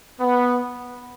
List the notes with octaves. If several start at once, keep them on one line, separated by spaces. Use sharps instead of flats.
B3